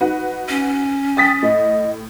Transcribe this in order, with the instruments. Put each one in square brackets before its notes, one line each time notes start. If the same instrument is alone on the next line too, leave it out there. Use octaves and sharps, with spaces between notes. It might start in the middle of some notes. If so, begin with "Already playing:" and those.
[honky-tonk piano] D#4 F#4 B4
[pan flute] C#4
[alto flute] G5 [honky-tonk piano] D#6 A6 B6
[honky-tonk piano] A2 [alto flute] D#5